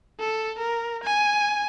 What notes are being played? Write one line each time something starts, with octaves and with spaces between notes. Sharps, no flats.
A4
A#4
G#5